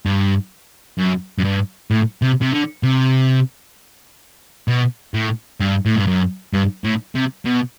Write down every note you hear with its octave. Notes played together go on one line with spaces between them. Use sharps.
G2
F#2
F#2
G2
A2
C3
C3
D3
C3
B2
A2
G2
A2
G2
F#2
G2
A2
C3
B2